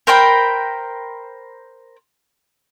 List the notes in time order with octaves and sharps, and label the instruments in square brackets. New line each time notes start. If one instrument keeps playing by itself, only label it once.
[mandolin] A#4 C5 G5 B5